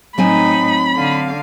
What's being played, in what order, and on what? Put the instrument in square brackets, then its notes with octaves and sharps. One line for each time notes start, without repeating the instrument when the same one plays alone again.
[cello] A2 D#4 [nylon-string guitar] F#3 C4 G#5 [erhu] B5
[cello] D3 F5